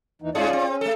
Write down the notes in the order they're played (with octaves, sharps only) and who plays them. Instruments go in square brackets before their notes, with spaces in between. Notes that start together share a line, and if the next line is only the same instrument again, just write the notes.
[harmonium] D#2 E3 D#4
[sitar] G2 G#3 G#4 [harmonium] C#4 F4 D5
[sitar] C4
[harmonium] C#4
[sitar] A3 A4